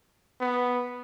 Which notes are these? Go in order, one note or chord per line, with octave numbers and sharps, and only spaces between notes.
B3